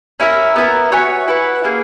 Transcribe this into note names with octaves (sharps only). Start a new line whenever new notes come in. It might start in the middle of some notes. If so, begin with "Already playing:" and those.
C#4 E4 A#4 E5
B3 E4 A#4
F#4 C#5 E5 G#5
E4 B4 F#5
A#3 C#4 E4 G#4